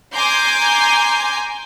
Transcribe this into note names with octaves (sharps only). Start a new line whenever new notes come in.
G#5 A#5 C6 D6 G6